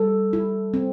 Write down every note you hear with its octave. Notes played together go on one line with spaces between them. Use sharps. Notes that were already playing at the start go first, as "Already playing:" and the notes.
Already playing: G3 A4
E4
C4